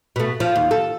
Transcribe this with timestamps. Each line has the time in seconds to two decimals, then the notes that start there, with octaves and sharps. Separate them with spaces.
0.16 B2 A3
0.40 F3
0.56 D#2
0.71 A4